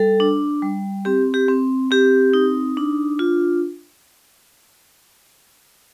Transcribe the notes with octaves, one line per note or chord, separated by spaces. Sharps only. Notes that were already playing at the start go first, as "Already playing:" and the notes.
Already playing: G3 A4
D4
G3
C4 G4
G4
C4
C4 G4
D#4
D4
F4